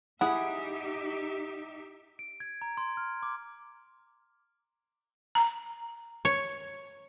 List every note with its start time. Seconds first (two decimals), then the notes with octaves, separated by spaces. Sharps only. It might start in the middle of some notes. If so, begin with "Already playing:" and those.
0.21 D#4 E4 G4 G#4 E5 F#5
2.19 D7
2.40 G#6
2.62 A#5
2.77 C6
2.97 F6
3.23 D6
5.35 A#5
6.25 C#5